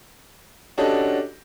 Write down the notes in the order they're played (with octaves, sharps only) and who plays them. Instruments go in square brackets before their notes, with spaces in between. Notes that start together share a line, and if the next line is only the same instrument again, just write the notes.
[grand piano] C#4 D4 F#4 G4 A4 D#5